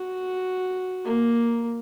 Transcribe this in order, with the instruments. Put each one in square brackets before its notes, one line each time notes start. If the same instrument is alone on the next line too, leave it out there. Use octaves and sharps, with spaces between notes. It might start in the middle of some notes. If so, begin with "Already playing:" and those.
Already playing: [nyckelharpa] F#4
A#3